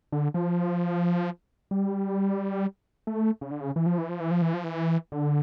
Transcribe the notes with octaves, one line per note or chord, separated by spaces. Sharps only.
D3
F3
G3
A3
C#3
D3
C#3
E3
F3
E3
F3
E3
F3
E3
F3
E3
D3